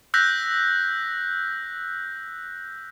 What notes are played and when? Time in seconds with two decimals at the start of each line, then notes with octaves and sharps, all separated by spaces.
0.14 E6 F#6 G6 A#6 B6